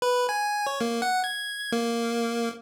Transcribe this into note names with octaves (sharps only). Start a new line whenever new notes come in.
B4
G#5
C#5
A#3
F#5
G#6
A#3